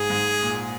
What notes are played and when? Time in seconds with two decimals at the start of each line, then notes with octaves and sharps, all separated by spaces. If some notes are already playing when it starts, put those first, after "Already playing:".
Already playing: G#2 G#4
0.10 G#2
0.42 A#2